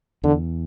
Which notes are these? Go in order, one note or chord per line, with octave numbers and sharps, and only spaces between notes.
E2 D3